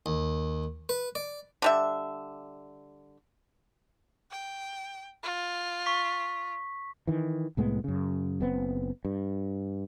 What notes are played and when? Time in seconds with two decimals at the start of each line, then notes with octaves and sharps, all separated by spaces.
0.06 D#2
0.89 B4
1.15 D5
1.62 D3 G3 E5
4.32 G5
5.23 F4
5.86 C#6 B6
7.07 D#3 E3
7.57 C2 A2 G#3 B3
7.84 F#2 C#3
8.41 F#1 B3 C4
9.05 G2